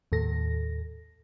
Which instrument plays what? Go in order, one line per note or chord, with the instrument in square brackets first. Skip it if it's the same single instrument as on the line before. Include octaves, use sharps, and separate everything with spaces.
[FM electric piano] D#2 A2 A4 A#6